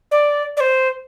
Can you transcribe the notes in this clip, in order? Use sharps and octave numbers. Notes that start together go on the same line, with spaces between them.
D5
D5
C5